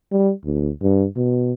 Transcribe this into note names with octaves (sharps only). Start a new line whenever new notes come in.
G3
D2
G2
B2